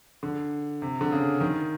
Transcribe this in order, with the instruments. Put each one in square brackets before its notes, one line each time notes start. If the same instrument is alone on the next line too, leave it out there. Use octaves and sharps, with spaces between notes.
[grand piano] D3
C3
D3
C#3
D#3